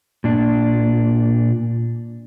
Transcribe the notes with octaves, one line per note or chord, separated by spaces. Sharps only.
A#2 D4